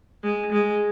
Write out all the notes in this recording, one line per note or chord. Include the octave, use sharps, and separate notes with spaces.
G#3
G#3